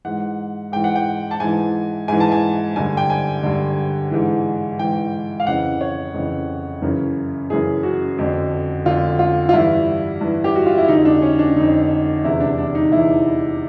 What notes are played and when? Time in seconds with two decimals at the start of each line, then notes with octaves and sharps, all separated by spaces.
0.05 G#2 E3 F#5
0.72 G#2 E3 G5
0.84 F#5
0.96 G5
1.31 A5
1.40 G#2 E3 G#5
2.08 G#2 E3 G#5
2.20 A5
2.32 G#5
2.76 G2 D3 G#5
2.97 G5
3.10 G#5
3.43 G2 D3
4.11 G#2 E3
4.79 G#2 E3 G5
5.40 F5
5.47 F2 C#3 E3 F#5
5.81 C#5
6.14 F2 C#3 E3
6.82 F#2 C#3 E3
7.50 F#2 C#3 E3 G#4
7.83 F#4
8.18 F2 D3
8.86 F2 D3 F4
9.19 F4
9.49 F4
9.53 G2 E3 E4
10.21 G2 E3
10.44 G4
10.55 F#4
10.66 F4
10.77 E4
10.88 F2 D3 D#4
11.05 D4
11.22 C#4
11.39 D4
11.56 F2 D3 D#4
12.24 E2 C3 E3 E4
12.40 D4
12.58 D4
12.75 D#4
12.92 E2 C3 E3 E4